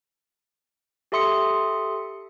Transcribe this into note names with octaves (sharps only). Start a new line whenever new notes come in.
G4 A4 E5 C6 D#6 C#7